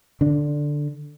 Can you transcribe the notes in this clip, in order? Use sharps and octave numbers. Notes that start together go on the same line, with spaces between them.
D3 D4